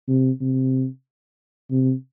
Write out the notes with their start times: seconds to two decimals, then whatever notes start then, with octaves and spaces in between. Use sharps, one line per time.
0.08 C3
0.41 C3
1.71 C3